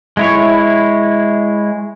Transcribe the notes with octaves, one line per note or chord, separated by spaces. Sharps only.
G#3 E4 C#5